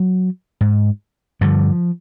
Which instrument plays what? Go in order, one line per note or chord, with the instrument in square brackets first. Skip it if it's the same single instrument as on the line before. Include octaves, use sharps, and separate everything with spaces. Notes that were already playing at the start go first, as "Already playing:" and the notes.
Already playing: [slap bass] F#3
G#2
G2 D3 F3